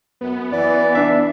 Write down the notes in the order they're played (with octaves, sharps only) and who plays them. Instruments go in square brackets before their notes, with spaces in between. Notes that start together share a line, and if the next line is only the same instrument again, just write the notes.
[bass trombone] F#2 [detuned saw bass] B3
[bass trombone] E3 [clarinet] D5
[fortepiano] D4 E5